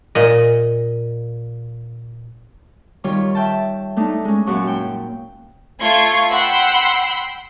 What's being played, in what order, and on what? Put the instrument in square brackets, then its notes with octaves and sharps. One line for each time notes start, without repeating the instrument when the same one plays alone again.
[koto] A#2 D#5
[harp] D#3 G3 F4 C#5
E5 G5 A5
A3 D4 D#4
G#3 C#4
F#2 A#2 C#6
G5
[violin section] A3 F4 C6 C#6 G#6
F#5 G5 B5 C6 E6